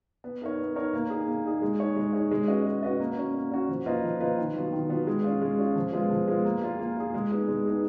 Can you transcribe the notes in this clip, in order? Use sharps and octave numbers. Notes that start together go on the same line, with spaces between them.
B3
D#4 A#4 C#5
B3
D#4 A#4 C#5
A#3
D#4 G#4
A#3
D#4 G#4
G#3
D#4 G#4 C#5
G#3
D#4 G#4 C#5
G#3
C#4 F#4 B4 D#5
G#3
C#4 F#4 B4 D#5
A#3
C#4 F#4
A#3
C#4 F#4
F3
A#3 F4 B4 D#5
F3
A#3 F4 B4 D#5
D#3
F#3 B3 F4
D#3
F#3 B3 F4
G#3
C#4 F4
G#3
C#4 F4
F3
G#3 B3 F4
F3
G#3 B3 F4
A#3
F4 G#4
A#3
F4 G#4
G#3
B3 D#4 G#4
G#3
B3 D#4 G#4